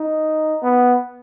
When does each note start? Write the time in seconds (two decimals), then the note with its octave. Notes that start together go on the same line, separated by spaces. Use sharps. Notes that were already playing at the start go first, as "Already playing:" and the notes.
Already playing: D#4
0.63 B3